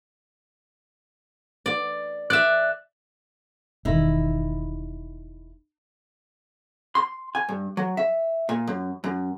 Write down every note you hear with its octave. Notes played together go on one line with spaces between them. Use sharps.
D5
D5 E5 F#6
E1 D#3 D#4 E4
C6
G#5
G2
F#3
E5
A#2
F#2
F#2